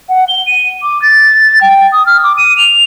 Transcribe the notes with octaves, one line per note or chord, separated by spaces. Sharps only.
F#5
G7
D#7
D6
A6
G5
D#6
F6
D6
D#7
F7